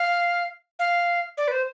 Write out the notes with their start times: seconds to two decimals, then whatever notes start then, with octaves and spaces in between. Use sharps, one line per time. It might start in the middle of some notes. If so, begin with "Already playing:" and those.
Already playing: F5
0.79 F5
1.37 D5
1.48 B4
1.52 C5